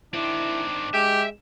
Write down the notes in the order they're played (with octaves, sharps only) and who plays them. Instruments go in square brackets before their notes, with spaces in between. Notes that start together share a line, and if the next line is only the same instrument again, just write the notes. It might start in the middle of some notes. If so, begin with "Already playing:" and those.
[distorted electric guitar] D#3 C4 [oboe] D4 [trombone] E4
[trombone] G#3 [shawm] G4 [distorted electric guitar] E5